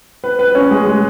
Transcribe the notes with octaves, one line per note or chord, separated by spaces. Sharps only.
B4
B4
C#4
G#3
G#3